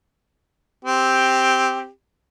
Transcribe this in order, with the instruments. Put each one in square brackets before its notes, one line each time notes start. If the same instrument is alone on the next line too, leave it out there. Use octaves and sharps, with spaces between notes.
[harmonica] C4 G4